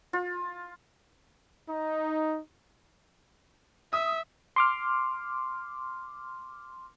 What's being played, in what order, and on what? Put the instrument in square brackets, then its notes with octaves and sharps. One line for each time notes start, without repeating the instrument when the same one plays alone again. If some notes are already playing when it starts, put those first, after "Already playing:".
[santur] F4
[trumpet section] D#4
[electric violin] E5 [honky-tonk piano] D#6
[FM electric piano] C6 D6 F6